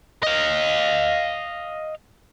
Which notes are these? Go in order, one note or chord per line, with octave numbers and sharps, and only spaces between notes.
D#5 F5